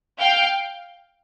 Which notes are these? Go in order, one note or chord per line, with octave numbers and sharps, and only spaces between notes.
F5 G5